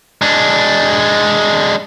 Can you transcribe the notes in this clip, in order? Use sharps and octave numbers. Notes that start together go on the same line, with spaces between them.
G#3 D4